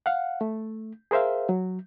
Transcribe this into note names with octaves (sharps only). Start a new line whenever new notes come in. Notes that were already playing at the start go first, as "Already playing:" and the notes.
F5 F#5
A3
G#4 A#4 C5 E5 F5
F#3